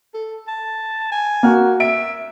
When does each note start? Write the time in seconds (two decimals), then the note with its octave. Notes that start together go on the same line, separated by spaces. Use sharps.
0.14 A4
0.48 A5
1.12 G#5
1.43 A#3 F#4
1.80 E5 D7